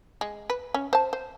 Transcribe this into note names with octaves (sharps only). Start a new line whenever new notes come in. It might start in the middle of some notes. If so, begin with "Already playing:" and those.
G#3
B4
C#4
C5 A5
C5